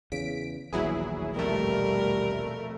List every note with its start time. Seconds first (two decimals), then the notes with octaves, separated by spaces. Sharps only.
0.12 E2 C#3 B6 D7
0.73 D#1 A#1 E2 F#3 E4 G#4
1.36 F2 B2 G3 A3 A#4